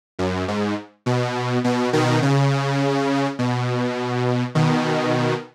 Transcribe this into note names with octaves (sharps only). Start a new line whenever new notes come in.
F#2
G#2
B2
B2
B2 D#3
C#3
B2
B2 D#3